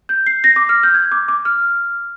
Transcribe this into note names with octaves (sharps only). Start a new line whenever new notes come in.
G6
C7
A#6
D6
F6
G6
G#6
D6
D6
F6